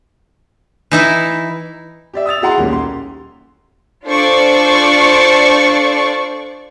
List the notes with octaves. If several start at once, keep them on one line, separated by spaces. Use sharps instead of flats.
E3 D#4 E4
G4 D5 E5
D#6 E6 A6 F7
E4 F#4 G#4 F#5 A#5 C6
D#1 B1 A#3 C#4 G4
C6
D4 F4 A4 C5 D5 C#6